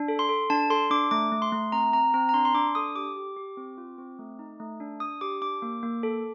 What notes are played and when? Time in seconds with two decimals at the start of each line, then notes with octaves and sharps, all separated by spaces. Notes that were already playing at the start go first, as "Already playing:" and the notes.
Already playing: D4
0.08 A4
0.19 C6
0.29 A4
0.50 D4 A5
0.70 A4 C6
0.91 D4 D6
1.11 A3 D6
1.32 A3
1.42 C6
1.52 A3
1.72 C4 A#5
1.93 C4 A#5
2.14 C4 A#5
2.29 A#5
2.34 D4 C6
2.45 C6
2.55 D4 D6
2.75 A4 D#6
2.96 G4 D6
3.16 G4
3.37 G4
3.57 C4
3.78 F4
3.98 C4
4.19 A3
4.39 D#4
4.60 A3
4.80 D4
5.00 D4 D#6
5.21 G4 D6
5.41 D4 D6
5.62 A#3
5.83 A#3
6.03 A4